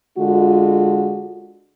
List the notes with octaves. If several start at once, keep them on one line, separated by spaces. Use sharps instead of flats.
D3 G#3 F4 F#4